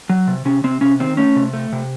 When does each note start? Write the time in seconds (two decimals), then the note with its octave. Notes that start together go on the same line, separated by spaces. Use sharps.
0.10 F#3
0.27 C3
0.45 C3 C#4
0.64 C3 C4
0.81 C3 C#4
1.00 D#3 C4
1.17 A3 C#4
1.36 C3
1.53 A3
1.73 C3